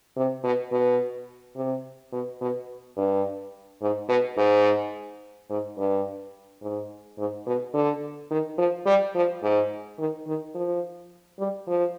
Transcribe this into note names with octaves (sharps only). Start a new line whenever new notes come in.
C3
B2
B2
C3
B2
B2
G2
G#2
B2
G#2
G#2
G2
G#2
G#2
B2
D3
D#3
F3
G3
F3
G#2
D#3
D#3
F3
G3
F3